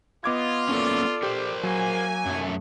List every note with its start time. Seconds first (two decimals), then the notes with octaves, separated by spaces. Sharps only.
0.24 B3 F4 D#5 D6 G#6
0.69 A3 A#3 C#4 A4 D5
1.23 G4 A#4 C5
1.63 F#3 A#3 G#5
2.26 F#2 A3